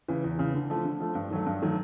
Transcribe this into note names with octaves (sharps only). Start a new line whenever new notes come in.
C#3 E3
E2
C#3 E3
D3
F3 A3
D3
F3 A3
G2
D#3 F#3 A3
G2
D#3 F#3 A3